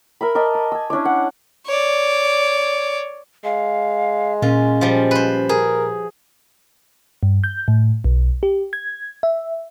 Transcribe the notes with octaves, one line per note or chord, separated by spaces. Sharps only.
A#4 E5 B5
A#4 D5 D#5 A5
B5
G#5 E6
C#4 D4 E4 D5
F#5
C#5 D5
G#3 F5
A#2 C#4 F4
F3 G3
B4 C5
G#4 A#4
G2
G6
A2
B1
G4
G#6
E5